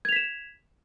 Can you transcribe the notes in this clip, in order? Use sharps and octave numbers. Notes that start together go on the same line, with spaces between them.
G#6 B6 E7 F7